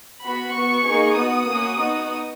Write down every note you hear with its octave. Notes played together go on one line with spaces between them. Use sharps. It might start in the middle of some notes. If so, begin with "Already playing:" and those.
B3 F#4 B5
B3 F#4 C#6
A#3 D#4 G#4
B3 F#4 D#6
A#3 C#4 F#4
B3 D#4 F#4